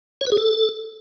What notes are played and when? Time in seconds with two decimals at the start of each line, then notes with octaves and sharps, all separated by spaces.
0.21 C#5
0.27 B4
0.32 G#4
0.37 A4